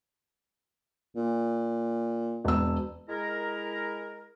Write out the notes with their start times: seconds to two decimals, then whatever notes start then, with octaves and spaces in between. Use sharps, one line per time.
1.16 A#2
2.45 E1 E6
3.09 G#3 E4 A#4